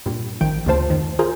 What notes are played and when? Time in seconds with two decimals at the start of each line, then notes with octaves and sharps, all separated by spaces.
0.06 G2 A#2 G3
0.41 A1 D#3 F3 G5 D7
0.66 D2 C#3 A3 F4 C5 A5
0.89 F2 D#3
1.19 F4 G#4 A#4 C5